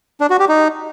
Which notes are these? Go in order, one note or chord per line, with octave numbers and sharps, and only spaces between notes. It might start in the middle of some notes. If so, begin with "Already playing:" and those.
D4
F#4
G4
D#4